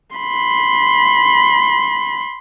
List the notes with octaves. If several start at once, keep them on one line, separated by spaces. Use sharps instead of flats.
B5 C6